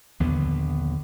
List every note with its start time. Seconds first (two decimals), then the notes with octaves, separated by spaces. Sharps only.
0.20 A#1 D#2 D3 B3